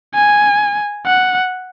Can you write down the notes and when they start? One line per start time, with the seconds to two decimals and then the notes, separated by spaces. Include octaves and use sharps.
0.14 G#5
1.06 F#5